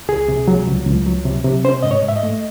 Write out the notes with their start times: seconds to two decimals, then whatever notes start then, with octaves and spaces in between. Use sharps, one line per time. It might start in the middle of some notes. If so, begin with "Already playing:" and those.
0.08 C#2 G#4
0.28 C3
0.48 F#3
0.67 C#2
0.87 C#2
1.06 F#3
1.25 C3
1.45 C3
1.64 C#4 C5
1.83 G#2 D#5
1.91 C#5
2.03 G#2
2.08 E5
2.16 D#5
2.23 A3